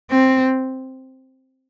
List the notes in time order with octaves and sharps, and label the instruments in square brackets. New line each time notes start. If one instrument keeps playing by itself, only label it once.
[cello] C4